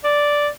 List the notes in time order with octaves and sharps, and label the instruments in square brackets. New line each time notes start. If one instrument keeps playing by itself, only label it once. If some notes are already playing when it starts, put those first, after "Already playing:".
[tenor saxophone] D5